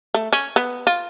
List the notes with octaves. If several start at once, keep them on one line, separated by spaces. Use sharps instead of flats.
A3
C#4
B3
F4